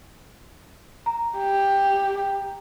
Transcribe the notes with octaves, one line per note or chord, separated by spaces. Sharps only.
A#5
G4